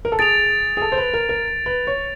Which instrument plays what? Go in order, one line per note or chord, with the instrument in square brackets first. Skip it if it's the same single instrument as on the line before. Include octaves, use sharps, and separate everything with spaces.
[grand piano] A#4
A4
[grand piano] G#4 [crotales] A6 D7 F7
[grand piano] G#4
A4
C5
B4
A#4
A#4
B4
C#5